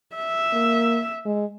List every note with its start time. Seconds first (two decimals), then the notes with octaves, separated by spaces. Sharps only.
0.16 E5
0.53 A#3
1.26 G#3